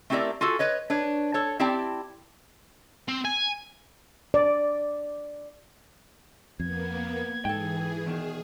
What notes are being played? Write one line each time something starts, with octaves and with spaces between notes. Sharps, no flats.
A3 C4 E4 G4 A#4 D5
F4 F#4 G#4 A4
B4 C#5 D#5
D4 B4 C#5
A4 C#5
C4 E4 G4 D5 G5 A5
C4
G#5
D5
F2 A#3 B3 G#6
G#2 E3 G#4 A4 G5
E2 B2 D#3 G#4